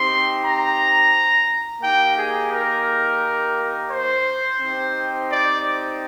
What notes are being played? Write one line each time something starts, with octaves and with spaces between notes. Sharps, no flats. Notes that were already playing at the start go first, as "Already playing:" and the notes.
Already playing: C4 D#4 G4 C6
A#5
A#3 D#4 G4 G5
G#4
A#4
C5
C4 D#4 G4
D5